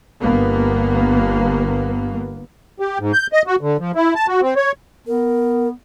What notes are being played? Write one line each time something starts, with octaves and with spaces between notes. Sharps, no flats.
G1 A#3 B3
G4
G#2
G6
D#5
F#4
D3
F3
E4
A5
F#4
C4
C#5
B3 A#4